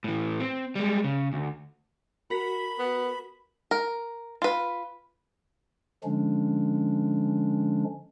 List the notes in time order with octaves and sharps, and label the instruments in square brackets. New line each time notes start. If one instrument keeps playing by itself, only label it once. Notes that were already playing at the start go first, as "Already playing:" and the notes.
[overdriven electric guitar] A2 E3
C4
G3 G#3
C#3
D2
[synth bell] F#4 A#4 B6 [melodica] B5
[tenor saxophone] B3
[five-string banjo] A#4
F4 B4
[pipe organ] D3 F3 G#3 C#4 D4